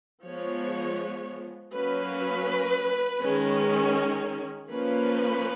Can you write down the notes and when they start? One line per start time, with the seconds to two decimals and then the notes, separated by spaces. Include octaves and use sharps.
0.23 F3 G#3 B3 C#5
1.72 F#3 A#3 C#4 B4
3.21 D#3 G#3 C#4
4.70 F3 A#3 C#4 B4